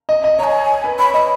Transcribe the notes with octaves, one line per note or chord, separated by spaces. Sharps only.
D#5
D#5
C#5 G#5 A#5
B4
C#5 B5
D#5 B5